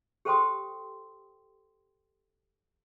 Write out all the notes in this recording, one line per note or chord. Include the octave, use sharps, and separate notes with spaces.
G4 A4 C5 G5 C6 D#6